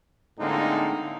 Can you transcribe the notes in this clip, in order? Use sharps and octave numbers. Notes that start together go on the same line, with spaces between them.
A2 D3 G#3 A#3 C4 D#4